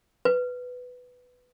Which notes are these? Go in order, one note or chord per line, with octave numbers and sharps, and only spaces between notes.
B4